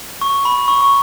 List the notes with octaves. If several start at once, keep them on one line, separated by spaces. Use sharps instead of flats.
C#6
B5
C#6
C#6